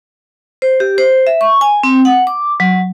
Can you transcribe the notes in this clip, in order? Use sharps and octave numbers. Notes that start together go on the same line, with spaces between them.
C5
G4
C5
E5
C#6
G#5
C4
F#5
D6
F#3